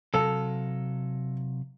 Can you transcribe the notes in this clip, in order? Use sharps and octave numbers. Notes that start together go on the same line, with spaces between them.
C3 F#3 A4 F5